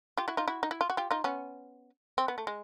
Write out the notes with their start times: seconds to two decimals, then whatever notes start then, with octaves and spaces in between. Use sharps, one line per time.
0.17 F4 G4
0.28 E4 F#4
0.37 D#4 F4
0.48 E4 F#4
0.63 D#4
0.71 E4
0.81 F4
0.90 F#4
0.97 F4 G4
1.11 D#4 F4
1.24 B3 C#4
2.18 C4
2.28 B3
2.38 A3
2.47 G#3